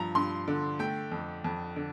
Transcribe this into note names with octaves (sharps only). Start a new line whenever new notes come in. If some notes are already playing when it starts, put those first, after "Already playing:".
Already playing: G2 F3 A#5
G2 C6
D3
A3 G5
F2
F2
D3